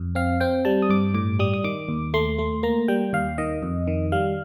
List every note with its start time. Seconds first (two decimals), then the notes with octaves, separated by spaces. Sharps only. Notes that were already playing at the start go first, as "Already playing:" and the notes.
Already playing: F2
0.15 C4 F5
0.40 C4 G5
0.65 G3 A5
0.82 D#6
0.89 G2 D6
1.14 A2 D6
1.39 G3 D#6
1.54 D#6
1.64 D#3 D6
1.89 D#2
2.14 A3 C6
2.39 A3
2.63 A#3 A#5
2.88 G3 G5
3.13 D#2 F5
3.38 D#3 D#5
3.63 F2
3.87 D#3
4.12 G3 F5